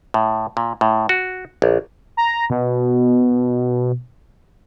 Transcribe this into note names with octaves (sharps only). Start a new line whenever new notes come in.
A2
A#2
A2
F#4
A#1
A#5
B2